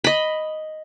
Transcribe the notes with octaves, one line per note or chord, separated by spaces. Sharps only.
D#5 B5